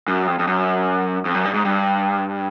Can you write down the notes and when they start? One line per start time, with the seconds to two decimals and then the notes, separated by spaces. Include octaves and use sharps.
0.08 F#2
0.27 F2
0.39 F2
0.47 F#2
1.25 F2
1.35 F#2
1.45 G2
1.54 G#2
1.65 G2